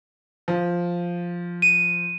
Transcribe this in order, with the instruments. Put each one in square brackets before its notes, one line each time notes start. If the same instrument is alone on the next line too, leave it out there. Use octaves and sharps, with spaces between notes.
[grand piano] F3
[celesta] D#7